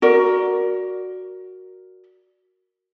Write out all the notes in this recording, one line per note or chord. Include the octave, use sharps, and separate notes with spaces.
F#4 A#4 D5